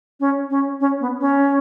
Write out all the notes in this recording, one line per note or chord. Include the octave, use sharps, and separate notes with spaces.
C#4
C#4
C#4
B3
C#4